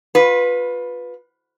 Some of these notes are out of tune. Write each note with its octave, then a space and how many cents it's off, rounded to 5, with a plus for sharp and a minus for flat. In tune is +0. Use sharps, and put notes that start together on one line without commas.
F4 +30 B4 +0